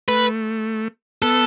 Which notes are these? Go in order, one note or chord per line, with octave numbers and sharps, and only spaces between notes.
A3 B4
B3 A4